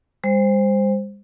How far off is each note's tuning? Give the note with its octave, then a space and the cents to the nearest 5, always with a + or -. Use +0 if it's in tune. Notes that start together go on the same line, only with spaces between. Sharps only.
G3 +45 C5 +0